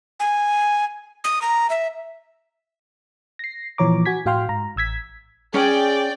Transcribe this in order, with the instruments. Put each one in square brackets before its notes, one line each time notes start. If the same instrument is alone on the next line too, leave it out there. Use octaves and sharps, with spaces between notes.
[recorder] G#5
D#6
A#5
E5
[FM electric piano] A#6 C7
A#2 E3 F3 C#5 A#5 D6
F#4 G#5 G#6 B6
A2 F#4 F5 G5 C6 F6
G#2 A#5
A1 E6 G#6 B6
[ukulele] C#4 [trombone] G#4 [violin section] D5 G5